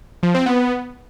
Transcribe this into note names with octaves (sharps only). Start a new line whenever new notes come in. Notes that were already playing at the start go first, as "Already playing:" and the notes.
F3
C4
B3